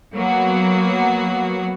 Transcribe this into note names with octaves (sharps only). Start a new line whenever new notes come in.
F#3 A#3 B3 F#4